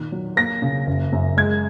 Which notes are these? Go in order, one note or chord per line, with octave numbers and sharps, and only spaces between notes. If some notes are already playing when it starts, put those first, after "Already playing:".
Already playing: A#2 D#3
F#3
A#3 A#6
C#3
F#1
F#2
G#3 G#6